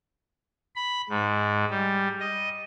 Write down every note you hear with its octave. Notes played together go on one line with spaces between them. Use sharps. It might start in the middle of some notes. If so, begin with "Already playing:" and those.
B5
G#2
G3
D#5